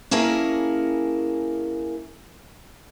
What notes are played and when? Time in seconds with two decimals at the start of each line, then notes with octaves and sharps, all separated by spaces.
0.11 A#3 C#4 E4 G#4 A#4 A5